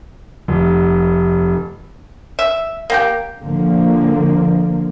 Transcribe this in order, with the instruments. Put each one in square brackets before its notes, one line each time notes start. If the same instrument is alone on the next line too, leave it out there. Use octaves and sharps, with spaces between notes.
[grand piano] F1
[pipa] E5
A#3 G4 G5
[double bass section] D3 F3 A#3